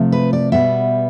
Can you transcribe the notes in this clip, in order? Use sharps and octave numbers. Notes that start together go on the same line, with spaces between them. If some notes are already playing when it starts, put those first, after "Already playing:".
Already playing: C3 F3 A3
B4
D5
B2 G3 B3 E5